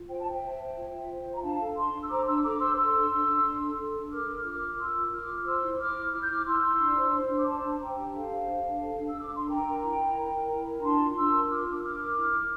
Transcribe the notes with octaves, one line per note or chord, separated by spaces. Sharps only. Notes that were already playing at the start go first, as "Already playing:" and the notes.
Already playing: F4
C5 G5
C5 A5
E5 G5
C5
C5
F4
F4
C5
F4
A#5
D4 F5 A5
A4
D4 A5 C6
D4
E6
C5 A#5 D6
D4 C6 E6
A4 A#5 D6
C5 C6 E6
A4 C6 E6
D4
D4
D4
D4
A4
A4
D4
A#4 D6 F6
A#4
F4 D6 F6
F4
F4 C6 E6
A#4
F4 D6 F6
F4
F6
C5 C6 E6
E4
E4 D6 F6
E4
E4 F6
G6
E4 D6 F6
E4 C6 E6
E4
D4
C5
C5
D4
D6
C5 A5 C6
D4
D4 G5 A#5
G4
A4 F5 A5
C5
D4
D4
A4
D4
E6
D4
D6
D4 C6
A#4 G5 A#5
A#4
E4
E4
A#4
A#4
E4
A#4
A#5
D4 A5 C6
F4
D4 C6 E6
A#4
F4 D6 F6
D4
E6
D4 D6 F6
A#4
E4
E4